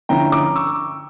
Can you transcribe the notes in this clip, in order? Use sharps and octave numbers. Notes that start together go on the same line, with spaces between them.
D3 F3 C#4 E4 G5 A#5
A#5 D6
C#6 E6